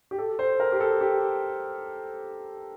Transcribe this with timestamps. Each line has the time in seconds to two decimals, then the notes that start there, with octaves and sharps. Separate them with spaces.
0.11 G4
0.18 A4
0.39 C5
0.60 A#4
0.72 G4
0.80 A4
1.01 G4